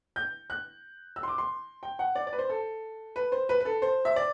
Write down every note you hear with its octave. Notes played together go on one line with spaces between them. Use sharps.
G6
F#6
E6
C6
D6
C6
G5
F#5
D5
D5
B4
C5
A4
B4
C5
B4
B4
A4
C5
E5
D5